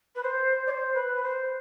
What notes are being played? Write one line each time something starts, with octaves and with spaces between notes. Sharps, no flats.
B4
C5
D5
C5
B4
C5